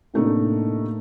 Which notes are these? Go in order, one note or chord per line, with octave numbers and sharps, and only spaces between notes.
A2 C3 A3 A#3 D4 D#4